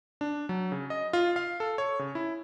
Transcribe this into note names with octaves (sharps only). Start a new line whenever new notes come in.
D4
F#3
C#3
D#5
F4
F5
A4
C#5
C#3
E4